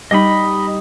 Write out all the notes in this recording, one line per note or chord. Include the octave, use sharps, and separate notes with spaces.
G3 D#4 D#5 B5